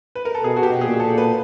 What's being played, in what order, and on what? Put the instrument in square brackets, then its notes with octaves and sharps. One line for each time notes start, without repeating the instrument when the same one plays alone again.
[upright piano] B4
A#4
A4
[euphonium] B2 [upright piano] G#4
[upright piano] F#4
G4
[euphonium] A#2 [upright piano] G#4
[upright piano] A4
B4